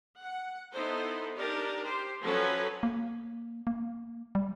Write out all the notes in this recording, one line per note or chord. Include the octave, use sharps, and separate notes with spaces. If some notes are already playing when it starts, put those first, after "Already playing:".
F#5
B3 D#4 E4 A4 C5
D4 D#4 G4 A#4 D5
G4 C5
F3 F#3 C#4 A4 B4 C#5
A#3
A#3
G3